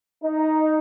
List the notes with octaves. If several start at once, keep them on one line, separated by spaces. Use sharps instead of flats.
D#4